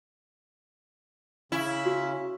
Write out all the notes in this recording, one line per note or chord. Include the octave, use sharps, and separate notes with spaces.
C#3 C#4 E4
F#4